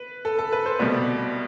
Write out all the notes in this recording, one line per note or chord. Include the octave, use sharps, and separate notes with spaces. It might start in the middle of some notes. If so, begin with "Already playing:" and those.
Already playing: B4
A4
A4
B4
C5
C2 B2 G3 D5